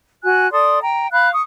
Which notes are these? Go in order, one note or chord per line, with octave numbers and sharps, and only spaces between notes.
F#4 G#5 F#6
A4 D5 C6 D#6
G5 A#5
F5 B5 F#6
C#6 D#6